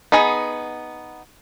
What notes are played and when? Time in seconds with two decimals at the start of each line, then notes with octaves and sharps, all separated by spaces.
0.12 B3 D#4 G#4 F#5